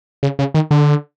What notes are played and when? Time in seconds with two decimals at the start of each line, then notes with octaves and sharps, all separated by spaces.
0.23 C#3
0.39 C#3
0.54 D#3
0.71 D3